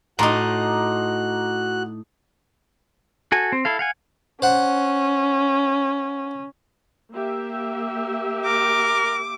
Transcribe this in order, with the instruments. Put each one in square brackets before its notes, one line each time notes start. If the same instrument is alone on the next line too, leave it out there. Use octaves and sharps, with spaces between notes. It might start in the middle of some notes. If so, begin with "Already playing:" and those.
[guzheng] A2 D#4 [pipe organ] F#4 F#6 [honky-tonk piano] A#5 C6 D6
[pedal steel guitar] F#4 A4 G#5
C4
E4 A4 F5
F5 F#5 G#5
[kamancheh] C#4 [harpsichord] C5 F#5
[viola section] A#3 G4 E5
[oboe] A#4 [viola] D6